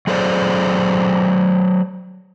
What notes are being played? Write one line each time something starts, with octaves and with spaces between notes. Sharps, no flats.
F#3 G#4 A4 C5 D5